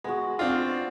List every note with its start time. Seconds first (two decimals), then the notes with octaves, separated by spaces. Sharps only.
0.04 G#3 B3 F#4
0.39 C4 D4 F4 D#5